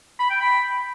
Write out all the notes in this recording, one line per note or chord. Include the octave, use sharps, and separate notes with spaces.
B5
G5
B5